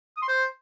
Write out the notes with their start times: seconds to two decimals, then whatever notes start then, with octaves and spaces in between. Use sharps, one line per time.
0.17 D#6
0.22 C6
0.28 C5